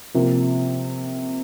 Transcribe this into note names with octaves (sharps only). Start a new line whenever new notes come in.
C3 F3 A#3